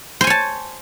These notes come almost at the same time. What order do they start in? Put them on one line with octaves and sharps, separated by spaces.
C5 G#5 C#5 A5